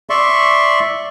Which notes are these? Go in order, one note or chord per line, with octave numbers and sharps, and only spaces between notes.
D5 E5 C6 C#6